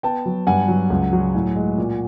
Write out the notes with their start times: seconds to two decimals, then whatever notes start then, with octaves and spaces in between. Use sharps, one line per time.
0.03 B3 G5 A5
0.26 F#3
0.47 G2 F#5 G#5
0.68 F#3
0.90 C#2
1.13 F#3
1.35 A2
1.56 G#3
1.78 A#2